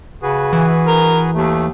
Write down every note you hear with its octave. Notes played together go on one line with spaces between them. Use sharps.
C#3 F#4 G#4 B4
E3
A#4
D#2 A3